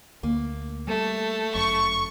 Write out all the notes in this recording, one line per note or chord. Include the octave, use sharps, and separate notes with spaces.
D2 A#3
G3 A3
G1 F#2 C#6